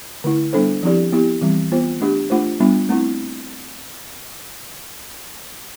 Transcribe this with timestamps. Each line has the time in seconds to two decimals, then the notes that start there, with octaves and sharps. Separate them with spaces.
0.24 D3 A3 E4
0.53 G3 B3 D4 A4 C5
0.83 F3 C4 E4 G4 D5
1.12 B3 E4 G4
1.41 E3 G3 C4
1.72 B3 F4 C5
2.01 A3 D4 G4
2.30 A3 D4 F4 C5
2.60 G3 B3 D4 F4
2.89 A3 C4 E4